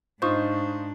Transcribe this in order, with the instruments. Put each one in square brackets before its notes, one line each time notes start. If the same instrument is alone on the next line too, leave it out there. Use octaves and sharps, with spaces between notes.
[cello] G#2 D4 [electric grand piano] D#4 F4 C5 [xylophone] C#6 D#6 G6